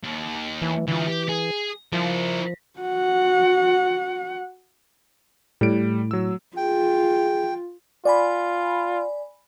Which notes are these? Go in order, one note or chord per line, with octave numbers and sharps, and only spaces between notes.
D#2
E3
D3 E3 F4
G4
G#4
F3 E4 A#4
F#4 F#5
A2 G3 D7
F#3 E6
F4 G#4 G5
F4 D5 G#5 B5